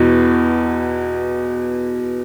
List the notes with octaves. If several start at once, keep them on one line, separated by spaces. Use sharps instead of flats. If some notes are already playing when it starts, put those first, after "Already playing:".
Already playing: E2 B2